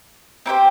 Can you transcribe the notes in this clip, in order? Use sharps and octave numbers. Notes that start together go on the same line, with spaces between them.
C4 E4 G4 C5